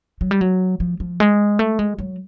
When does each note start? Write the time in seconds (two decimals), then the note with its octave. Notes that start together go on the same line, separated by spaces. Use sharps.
0.21 F#3
0.31 G3
0.41 F#3
0.80 F3
1.00 F3
1.20 G#3
1.59 A3
1.79 G#3
1.99 F#3